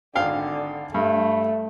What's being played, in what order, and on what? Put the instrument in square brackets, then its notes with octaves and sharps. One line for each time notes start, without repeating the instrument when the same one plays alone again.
[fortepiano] G#1 F5 G5 [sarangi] D3
[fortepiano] G2 [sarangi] A3